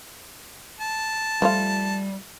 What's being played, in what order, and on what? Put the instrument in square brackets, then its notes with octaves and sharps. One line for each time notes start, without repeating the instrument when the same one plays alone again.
[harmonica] A5
[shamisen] F3 A3 F4 [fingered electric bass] G3